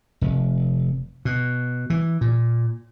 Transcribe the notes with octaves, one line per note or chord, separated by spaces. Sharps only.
F1
B2
E3
A#2